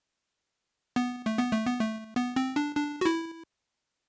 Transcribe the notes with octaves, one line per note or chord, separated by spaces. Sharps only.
B3
A3
B3
A3
B3
A3
B3
C4
D4
D4
F#4
E4